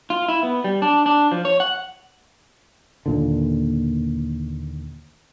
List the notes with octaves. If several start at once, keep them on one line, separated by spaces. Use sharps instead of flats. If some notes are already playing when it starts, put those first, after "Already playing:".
F4
E4
B3
G3
D4
D4
F3
C#5
F#5
D#2 A#2 D3